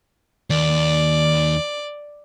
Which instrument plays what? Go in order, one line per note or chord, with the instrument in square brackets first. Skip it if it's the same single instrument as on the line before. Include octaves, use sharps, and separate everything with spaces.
[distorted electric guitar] D#2 [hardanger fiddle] D5